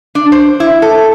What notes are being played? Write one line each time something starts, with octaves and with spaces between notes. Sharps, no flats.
D4
C5
E4
A4